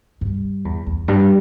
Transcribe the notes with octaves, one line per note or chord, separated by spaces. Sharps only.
G2
E2
E2
G2